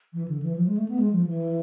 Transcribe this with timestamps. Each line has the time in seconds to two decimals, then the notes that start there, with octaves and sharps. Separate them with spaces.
0.13 E3
0.28 D3
0.42 E3
0.56 F3
0.67 G#3
0.77 A3
0.88 B3
0.98 G#3
1.13 F3
1.27 E3